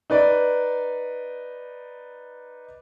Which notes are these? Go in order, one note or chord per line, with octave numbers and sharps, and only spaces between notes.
D#4 B4 D5